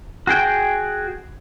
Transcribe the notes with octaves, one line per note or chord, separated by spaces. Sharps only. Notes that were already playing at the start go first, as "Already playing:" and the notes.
F#4 G#4 G5